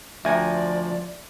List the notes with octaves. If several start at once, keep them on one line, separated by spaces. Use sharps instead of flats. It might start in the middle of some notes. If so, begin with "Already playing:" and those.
D2 F3 D5 E5 G5 G#5 A#5